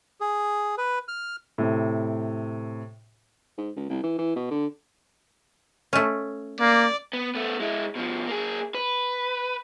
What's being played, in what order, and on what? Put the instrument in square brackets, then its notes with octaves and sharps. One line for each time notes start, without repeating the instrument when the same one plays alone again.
[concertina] G#4
B4
F6
[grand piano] A2 C3
[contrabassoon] G#2
C#2
C2
E3
E3
B2
D3
[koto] A3 C#4
[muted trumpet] A#3 [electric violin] D5
[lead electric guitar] B3
A3 B3
G#3 E4
B2 F3
A#3 G#4
B4